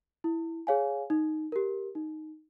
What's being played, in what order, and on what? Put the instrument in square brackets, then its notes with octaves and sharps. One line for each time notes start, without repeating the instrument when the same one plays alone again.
[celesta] E4
G#4 C#5 F5 G#5
D#4
G4 A#4
D#4